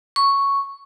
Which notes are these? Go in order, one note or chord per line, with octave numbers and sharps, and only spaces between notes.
C#6